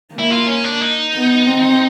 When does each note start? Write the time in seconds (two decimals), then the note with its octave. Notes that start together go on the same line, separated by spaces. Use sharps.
0.14 A#3 E4
0.31 F4
0.47 C#4
0.64 D4
0.81 D#4
1.14 B3
1.47 C4